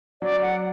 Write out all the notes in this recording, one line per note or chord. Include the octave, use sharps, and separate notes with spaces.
F#3 D5
F#5